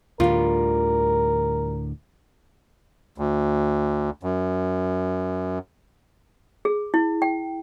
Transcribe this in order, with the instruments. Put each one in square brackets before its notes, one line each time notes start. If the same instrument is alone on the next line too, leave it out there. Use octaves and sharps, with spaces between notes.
[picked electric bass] D2 A2 D3 [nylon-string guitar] G3 F4 [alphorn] A#4
[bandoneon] D2
F#2
[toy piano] G#4
E4
G5